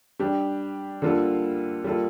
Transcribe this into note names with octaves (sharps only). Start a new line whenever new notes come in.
G3 D4 G4
D3 G3 A#3 F4 A4
G3 A#3 F4 A4